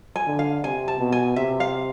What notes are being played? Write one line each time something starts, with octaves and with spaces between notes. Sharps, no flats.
G#5
D3
F5
C3 G#5
A5
B2
G#5
C3 E5
F5